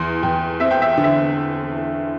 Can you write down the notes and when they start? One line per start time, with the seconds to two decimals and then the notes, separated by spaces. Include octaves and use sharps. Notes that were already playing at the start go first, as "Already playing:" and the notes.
Already playing: E2 C6
0.23 E2 G5
0.60 C4 E5
0.71 G5
0.82 E5
0.93 D3 G5
1.04 E5